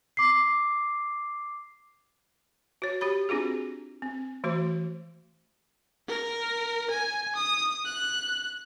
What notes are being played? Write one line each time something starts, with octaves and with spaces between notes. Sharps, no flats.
D6 C7
F#4 C#5
G4 C#5 B5
C4 D4 F4 F#4 G#4
C4
E3 A3 F#4 C5
A#4
G#5
D#6
F#6